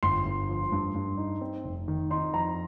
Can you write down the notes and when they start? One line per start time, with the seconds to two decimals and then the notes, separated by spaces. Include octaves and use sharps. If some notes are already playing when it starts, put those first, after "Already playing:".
0.03 G1 C6
0.25 G1
0.49 F3
0.72 G2
0.94 G2
1.17 D#4
1.41 C4
1.64 F1
1.88 D#3
2.10 D#4 C6
2.34 F2 A#5